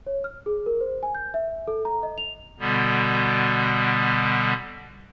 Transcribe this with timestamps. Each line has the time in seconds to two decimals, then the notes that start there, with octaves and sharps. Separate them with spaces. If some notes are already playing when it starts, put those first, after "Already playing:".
0.06 C#5
0.24 F6
0.46 G#4
0.66 A#4
0.81 C5
1.03 G#5
1.15 G6
1.34 E5
1.67 A4
1.85 A#5
2.03 D#5
2.18 F7
2.59 B2 D3 G3 B3